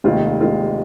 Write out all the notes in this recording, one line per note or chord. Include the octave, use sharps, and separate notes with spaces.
F1 D#2 D#3 G#3 F4
F1 D#2 D#3 G#3 F4